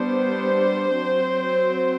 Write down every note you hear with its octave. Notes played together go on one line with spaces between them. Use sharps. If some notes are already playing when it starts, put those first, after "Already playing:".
Already playing: G3 B3 D4 C5
F#3 C4